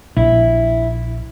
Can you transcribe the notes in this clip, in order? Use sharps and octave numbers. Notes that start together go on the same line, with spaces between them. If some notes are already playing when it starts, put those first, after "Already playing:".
A#1 E4